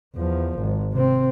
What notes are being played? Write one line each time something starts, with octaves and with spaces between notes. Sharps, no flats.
E2 F3
G#1
C3 C4